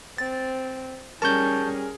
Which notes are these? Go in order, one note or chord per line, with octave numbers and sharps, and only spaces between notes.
C4 A6
G3 C#4 G#4 A#4 A5 C#6 G6